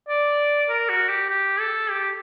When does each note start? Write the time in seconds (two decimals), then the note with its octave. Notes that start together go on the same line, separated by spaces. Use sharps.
0.09 D5
0.69 A#4
0.89 F#4
1.09 G4
1.30 G4
1.60 A4
1.90 G4